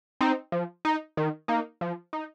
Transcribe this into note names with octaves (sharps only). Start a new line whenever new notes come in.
C4 D#4
F3
D#4
D#3
A#3 D#4
F3
D#4